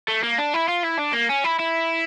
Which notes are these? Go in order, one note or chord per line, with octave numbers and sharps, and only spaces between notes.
A3
A#3
D4
E4
F4
E4
D4
A#3
C#4
E4
E4